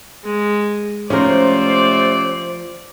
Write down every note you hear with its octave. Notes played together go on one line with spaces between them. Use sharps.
G#3
C3 F3 A3 C#4 A#4 C5 D5